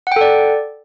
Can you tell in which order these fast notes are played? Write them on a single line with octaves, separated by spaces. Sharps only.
F#5 G5 A4 D5